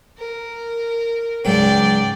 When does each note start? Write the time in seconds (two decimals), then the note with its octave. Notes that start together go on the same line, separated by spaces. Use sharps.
0.19 A#4
1.45 C#2 G#2 F#3 D5 G5